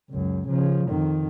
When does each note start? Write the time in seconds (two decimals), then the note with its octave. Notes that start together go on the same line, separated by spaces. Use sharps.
0.10 C#2 F#2
0.48 C#3 F3
0.89 F2 D#3